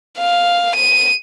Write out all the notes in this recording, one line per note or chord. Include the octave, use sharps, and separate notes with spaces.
F5
D#7